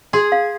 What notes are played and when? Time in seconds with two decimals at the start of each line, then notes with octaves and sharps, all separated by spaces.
0.13 G#4 C6
0.32 F5